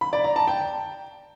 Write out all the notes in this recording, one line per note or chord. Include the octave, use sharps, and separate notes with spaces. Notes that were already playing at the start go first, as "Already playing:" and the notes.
B5
D5
A#5
A5
G5